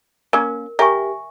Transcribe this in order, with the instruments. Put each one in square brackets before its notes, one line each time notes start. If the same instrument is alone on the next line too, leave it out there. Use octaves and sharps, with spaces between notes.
[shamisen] A#3 C#4 [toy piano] A#4
[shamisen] G4 A#4 [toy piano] E5 G#5 C#6